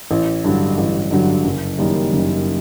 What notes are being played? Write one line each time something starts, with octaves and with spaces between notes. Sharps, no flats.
A1
G2 D3 F#3
A1
G2 D3 F#3
F#1
F#2 D#3 G3 A#3
F#1